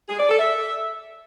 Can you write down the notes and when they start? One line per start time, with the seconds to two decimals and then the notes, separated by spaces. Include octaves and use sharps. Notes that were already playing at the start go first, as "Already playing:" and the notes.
0.09 G#4
0.19 D5
0.29 A4
0.39 E5